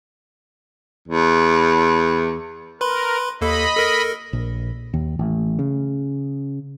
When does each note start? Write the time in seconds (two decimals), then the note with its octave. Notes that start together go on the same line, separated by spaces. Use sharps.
1.08 E2
2.81 A#4 B4 B5 C6
3.41 D#2 A#3 A4 D#5 B5
3.77 A4 A#4 A#6
4.33 A#1
4.94 D#2
5.19 A1
5.59 C#3